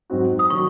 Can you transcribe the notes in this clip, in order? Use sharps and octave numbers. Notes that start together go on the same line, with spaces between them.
G#2 F#3 C4 F#4
D#6
D#3 F#3 C#6